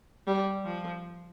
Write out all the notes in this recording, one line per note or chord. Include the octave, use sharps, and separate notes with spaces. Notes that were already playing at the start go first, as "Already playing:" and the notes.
G3
F3